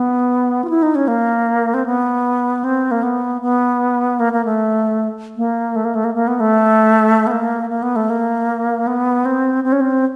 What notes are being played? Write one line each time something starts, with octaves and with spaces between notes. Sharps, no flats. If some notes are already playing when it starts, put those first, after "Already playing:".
Already playing: B3
F4
E4
D#4
C#4
A#3
C4
B3
C4
A#3
B3
B3
A#3
A#3
A3
A#3
A3
A#3
A3
A#3
A#3
B3
A3
B3
A#3
A#3
B3
A3
A#3
B3
C4
C4
C#4
C4